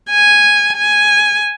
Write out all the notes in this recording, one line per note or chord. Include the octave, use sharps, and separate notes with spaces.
G#5
G#5